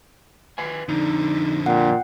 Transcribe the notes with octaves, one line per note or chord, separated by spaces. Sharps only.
B4 F5 G#5
F2 D3 D#4
A#2 F#5 G5